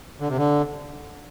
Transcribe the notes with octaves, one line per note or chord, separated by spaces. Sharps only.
D3
C3
D3